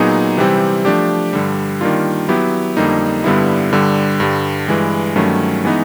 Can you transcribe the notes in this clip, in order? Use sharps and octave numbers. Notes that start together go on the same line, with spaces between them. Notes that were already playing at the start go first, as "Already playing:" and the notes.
Already playing: A#2 F#3 B3 D#4 G#4
C3 E3 G3 C4
F3 A3 D4 G4
G2 D3 G3
D#3 G3 A#3 D4 F4
F#3 B3 E4 G4
F2 D3 G3 A#3 D#4
G2 D3 G3 B3 E4
G2 D3 G3
G2 D3 G3
G2 E3 G#3
G2 D#3 F#3 A3 C#4
E3 G#3 B3 D#4